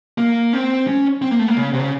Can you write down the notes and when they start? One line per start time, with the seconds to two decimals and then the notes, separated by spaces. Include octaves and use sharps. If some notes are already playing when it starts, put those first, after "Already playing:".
0.18 A#3
0.53 C4
0.87 C#4
1.22 C4
1.31 A#3
1.39 A3
1.48 A#3
1.57 C#3
1.73 C3
1.80 C#3